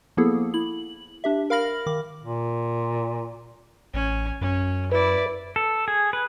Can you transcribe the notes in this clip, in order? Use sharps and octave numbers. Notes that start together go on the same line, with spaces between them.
F3 A#3 B3 E4 G#4 A4
E4 F#7
D4 G4 E5
A#4 F5 B5 F6 A#6 F#7
D#3 D6
A#2
A1 C#4 G#5
F#2 C#4
E4 B4 D5
A4
G#4
B4